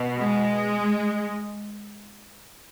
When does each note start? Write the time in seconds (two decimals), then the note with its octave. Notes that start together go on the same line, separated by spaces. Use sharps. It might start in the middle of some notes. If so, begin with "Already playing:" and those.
Already playing: B2
0.20 G#3